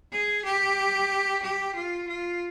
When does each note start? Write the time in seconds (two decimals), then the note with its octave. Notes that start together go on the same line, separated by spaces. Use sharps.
0.12 G#4
0.45 G4
1.42 G4
1.75 F4
2.07 F4